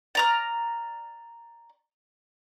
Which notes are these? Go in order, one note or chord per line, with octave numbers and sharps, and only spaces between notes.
D5 A#5 F6